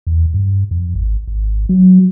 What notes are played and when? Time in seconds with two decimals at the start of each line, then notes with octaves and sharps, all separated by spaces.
0.07 E2
0.34 G2
0.71 F2
0.95 G#1
1.28 G#1
1.69 F#3